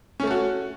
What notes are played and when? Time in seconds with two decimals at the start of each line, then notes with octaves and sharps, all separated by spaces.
0.20 C#4
0.23 A3
0.27 A4
0.31 F#4